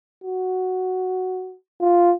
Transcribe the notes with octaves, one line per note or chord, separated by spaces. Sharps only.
F#4
F4